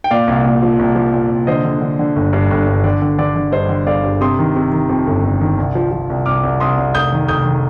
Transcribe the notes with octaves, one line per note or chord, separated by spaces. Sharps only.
G5
A#2 D5 F5
C2
A#2
F3
C2
F3
A#2
C2
D3 C5 D#5
D3
D3
D3
G1
G2
G1
G2
D3 D5
D3
D3 D5
D3
G2 C5 D#5
D3
G1 D5 F5
G2
C3 C6 D#6
D#3
C3
D#3
F2
G1
G1
D#3
C2
F3
F3
C2
C2 D6 F6
C2
C2 C6 D#6
C2
F1 D#6 G6
D#3
F1 D#6 G6
D#3